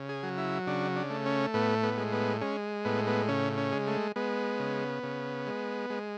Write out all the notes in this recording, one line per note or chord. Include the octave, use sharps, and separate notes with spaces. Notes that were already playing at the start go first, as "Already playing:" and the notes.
Already playing: C#3
G#4
F#3
E4
C#3 D4
D4
A3
C#4
A2 B3
B3
G#3
B3
G#3 C#4
A2 B3
B3
C#3 C#4
C#4
G#3
A3
G#3 B3
C#3
C#3
G#3
G#3